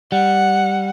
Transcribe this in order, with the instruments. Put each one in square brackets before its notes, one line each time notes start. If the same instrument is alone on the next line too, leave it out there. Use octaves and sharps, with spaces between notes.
[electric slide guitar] G3 [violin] F#5